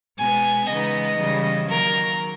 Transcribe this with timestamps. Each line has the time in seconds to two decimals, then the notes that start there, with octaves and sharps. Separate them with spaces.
0.19 B2 G#3 B3 G#5
0.69 C#3 E3 G#3 B3 D#4 D#5
1.19 C#3 E3 G3
1.69 D#3 F#3 A#3 A#4